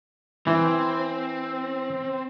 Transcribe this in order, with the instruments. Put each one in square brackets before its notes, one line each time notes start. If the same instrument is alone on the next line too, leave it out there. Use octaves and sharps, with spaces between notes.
[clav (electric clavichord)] E3 [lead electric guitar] C4